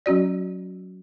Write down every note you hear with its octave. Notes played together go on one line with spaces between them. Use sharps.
F#3 C#4 F#4 D5